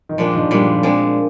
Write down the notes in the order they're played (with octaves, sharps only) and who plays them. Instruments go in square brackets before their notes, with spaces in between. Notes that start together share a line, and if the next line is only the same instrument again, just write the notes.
[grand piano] D#3
[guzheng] A#2 G#3 D4 [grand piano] F3
[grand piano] D#3
[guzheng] A#2 G#3 D4 [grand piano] G3
[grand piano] F3
F3
[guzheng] A#2 G#3 D4 [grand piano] C4